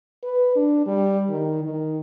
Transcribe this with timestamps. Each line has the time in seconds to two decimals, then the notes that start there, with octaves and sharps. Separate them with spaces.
0.23 B4
0.56 D4
0.86 G3
1.29 D#3
1.63 D#3